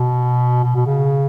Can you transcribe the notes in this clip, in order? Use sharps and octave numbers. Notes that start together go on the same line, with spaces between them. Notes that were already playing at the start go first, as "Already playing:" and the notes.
Already playing: B2
B2
B2
C#3